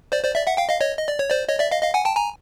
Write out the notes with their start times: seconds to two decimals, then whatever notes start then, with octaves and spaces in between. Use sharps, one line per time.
0.12 C5 D5
0.24 C5 D5
0.35 D5 E5
0.46 E5 F#5
0.57 F5 G5
0.69 D#5 F5
0.81 C#5 D#5
0.98 D#5
1.08 D5
1.19 C#5
1.31 C5 D5
1.48 C#5 D#5
1.59 D5 E5
1.71 D#5 F5
1.82 D#5 F5
1.94 F#5 G#5
2.05 G5 A5
2.16 G#5 A#5